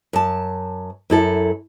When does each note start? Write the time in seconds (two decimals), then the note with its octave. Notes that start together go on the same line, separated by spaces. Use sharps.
0.13 F#2 A5
1.10 F#2 E4 A4